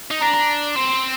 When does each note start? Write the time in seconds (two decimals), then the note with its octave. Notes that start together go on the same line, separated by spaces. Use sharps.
0.11 D#4
0.22 D4 A#5
0.76 C4 C6